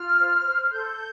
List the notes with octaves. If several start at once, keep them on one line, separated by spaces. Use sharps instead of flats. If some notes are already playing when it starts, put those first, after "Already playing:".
Already playing: F4 F6
C5
C5
F6
A4 G6